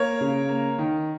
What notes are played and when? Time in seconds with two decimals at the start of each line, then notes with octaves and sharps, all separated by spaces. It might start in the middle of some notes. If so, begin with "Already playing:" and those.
Already playing: A#3 A#4 C#5
0.21 C#3
0.49 A#3
0.78 D#3